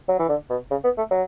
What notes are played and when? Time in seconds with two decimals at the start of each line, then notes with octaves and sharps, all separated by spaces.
0.09 F#3
0.19 E3
0.29 D3
0.50 B2
0.71 C#3
0.84 B3
0.98 A3
1.10 F#3